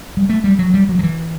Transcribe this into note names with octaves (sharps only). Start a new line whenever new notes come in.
G3
A3
G3
F#3
G3
F#3
F#3
E3